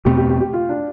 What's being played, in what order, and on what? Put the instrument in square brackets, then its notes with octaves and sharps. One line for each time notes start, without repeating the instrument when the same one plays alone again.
[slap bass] E2 B2 A3 C4 [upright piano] G4
[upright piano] G4
G4
G4
F4
D4